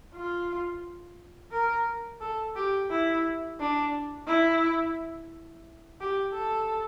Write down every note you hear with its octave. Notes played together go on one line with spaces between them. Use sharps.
F4
A#4
A4
G4
E4
D4
E4
G4
A4